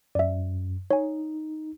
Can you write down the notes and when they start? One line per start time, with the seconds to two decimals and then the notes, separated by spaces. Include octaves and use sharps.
0.15 F#2 D5 E5
0.91 D#4 C#5 G#5